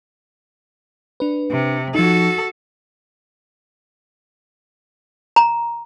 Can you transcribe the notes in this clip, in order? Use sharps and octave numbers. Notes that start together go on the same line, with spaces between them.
D4 B4
C3
F3 D#4 F#4 A4
A#5